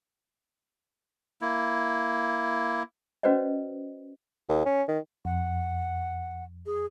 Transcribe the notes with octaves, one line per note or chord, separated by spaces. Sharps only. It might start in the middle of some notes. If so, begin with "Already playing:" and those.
A#3 E4
C#4 F#4 B4 C5 D5 D#5
D#2
C#4
D#3
F2 F#5
G#4